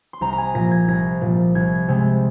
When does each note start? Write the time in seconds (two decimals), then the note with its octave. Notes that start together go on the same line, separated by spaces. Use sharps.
0.13 C6
0.21 C2 A#5
0.33 A#5
0.38 G#5
0.54 A#2 F3 A#6
0.71 G#6
0.88 C2 A#6
1.21 A#2 F3
1.55 C2 G#6
1.88 C3 G#3 C4